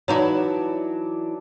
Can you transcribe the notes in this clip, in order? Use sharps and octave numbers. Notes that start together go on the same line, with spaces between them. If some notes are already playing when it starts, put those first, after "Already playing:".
E3 F#3 D#4 E4 C#5 D5 A5 A#5